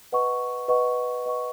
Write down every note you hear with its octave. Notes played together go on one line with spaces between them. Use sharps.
B4 D#5 F#5 C#6
B4 D#5 F#5 C#6
B4 D#5 F#5 C#6